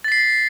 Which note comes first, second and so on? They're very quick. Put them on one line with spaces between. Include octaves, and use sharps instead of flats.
A6 B6 C7